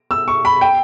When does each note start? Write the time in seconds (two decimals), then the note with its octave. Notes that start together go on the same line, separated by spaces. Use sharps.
0.11 E6
0.28 C#6
0.45 B5
0.61 G5